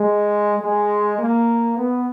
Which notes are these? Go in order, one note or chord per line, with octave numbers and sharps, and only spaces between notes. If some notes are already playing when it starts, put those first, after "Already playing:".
Already playing: G#3
G#3
A#3
B3